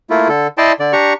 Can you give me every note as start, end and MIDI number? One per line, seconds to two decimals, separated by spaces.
0.10 0.28 57
0.10 0.28 58
0.10 0.28 64
0.10 0.28 65
0.28 0.47 50
0.28 0.47 69
0.58 0.72 64
0.58 0.72 74
0.58 0.72 75
0.58 0.72 79
0.58 0.72 81
0.58 0.72 84
0.80 0.93 50
0.80 0.93 74
0.93 1.13 62
0.93 1.13 67
0.93 1.13 82
0.93 1.13 85